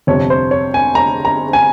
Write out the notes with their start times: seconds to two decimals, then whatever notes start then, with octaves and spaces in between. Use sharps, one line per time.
0.07 G1 F2 C3 F3 C#5
0.30 C5
0.51 C#5
0.74 G#5
0.95 A#5
1.25 A#5
1.53 G#5